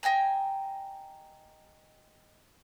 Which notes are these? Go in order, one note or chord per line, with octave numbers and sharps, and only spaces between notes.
D#5 G5 G#5 A#5